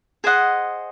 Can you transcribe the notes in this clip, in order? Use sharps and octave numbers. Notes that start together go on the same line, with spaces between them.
G#4 C5 D#5 F#5